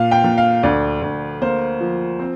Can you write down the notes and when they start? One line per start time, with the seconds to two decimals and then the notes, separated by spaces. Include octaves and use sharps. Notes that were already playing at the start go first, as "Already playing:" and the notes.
Already playing: A#2 F5
0.11 G5
0.24 A#2
0.38 F5
0.63 D2 D5
1.02 D2
1.42 A#3 C5
1.80 F3
2.19 C4